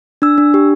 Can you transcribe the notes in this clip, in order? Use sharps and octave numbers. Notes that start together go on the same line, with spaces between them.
D4 E6
D4
G4